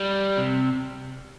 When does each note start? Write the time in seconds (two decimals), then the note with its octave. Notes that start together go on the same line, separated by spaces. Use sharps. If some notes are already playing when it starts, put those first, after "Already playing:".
Already playing: G3
0.38 C3